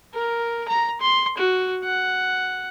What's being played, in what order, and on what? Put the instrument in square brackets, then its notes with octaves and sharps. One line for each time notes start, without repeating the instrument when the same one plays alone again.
[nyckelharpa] A#4
A#5
C6
F#4
F#5